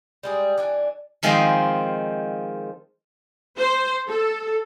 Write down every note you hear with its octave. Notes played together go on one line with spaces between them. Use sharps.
G3 G#3 G#4
E3 D4 G#5
D#3 F3 G#3 C4 C5 D#5
C5
A4